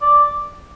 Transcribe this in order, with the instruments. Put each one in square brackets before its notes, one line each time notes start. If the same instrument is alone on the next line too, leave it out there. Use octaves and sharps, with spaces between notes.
[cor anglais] D5